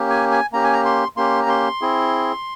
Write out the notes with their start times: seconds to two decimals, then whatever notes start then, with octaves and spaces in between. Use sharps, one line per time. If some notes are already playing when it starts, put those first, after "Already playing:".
Already playing: A#3 C#4 G4
0.10 G#5
0.31 G#5
0.52 A#3 C#4 G4 A#5
0.64 G#5
0.73 A#5
0.85 C6
1.17 A#3 C#4 G4 C6
1.43 A#5
1.49 C6
1.82 C4 E4 G#4